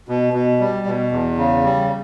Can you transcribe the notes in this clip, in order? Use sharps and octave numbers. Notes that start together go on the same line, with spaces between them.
B2
B2
G3
B2
E2
C#3
G3